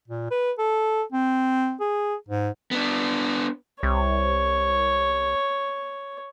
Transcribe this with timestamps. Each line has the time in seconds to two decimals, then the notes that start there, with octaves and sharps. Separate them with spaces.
0.08 A#2
0.31 B4
0.58 A4
1.12 C4
1.80 G#4
2.28 G#2
2.71 B3 D4
3.83 C2 C#5